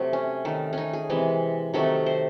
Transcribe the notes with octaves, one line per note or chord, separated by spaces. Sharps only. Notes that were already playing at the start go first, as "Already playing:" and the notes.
Already playing: C3 F#3 A3
C#4
D#3 A3
C#4 D#4
G#4
C3 E3 G#3
C3 D#3 F#3 A3 A4
C5